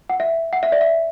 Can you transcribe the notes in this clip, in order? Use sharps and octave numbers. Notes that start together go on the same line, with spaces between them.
F#5
E5
F#5
E5
D5
E5